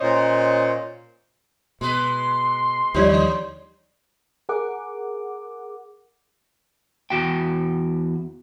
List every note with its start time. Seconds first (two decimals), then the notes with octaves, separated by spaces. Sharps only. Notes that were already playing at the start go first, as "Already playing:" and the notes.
0.01 A#2 C#4 C5 C#5 D#5
1.81 B2 G#3 B4 C6
2.94 D#2 D3 F3 G3 G4 C#5 D5
4.49 G#4 A#4 F#5 D6
7.10 E2 F#4 G5